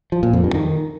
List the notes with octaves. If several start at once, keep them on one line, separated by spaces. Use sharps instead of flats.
F3
A#2
F2
G2
D#3